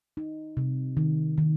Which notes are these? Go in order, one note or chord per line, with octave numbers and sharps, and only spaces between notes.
D#4
C3
D#3
D#3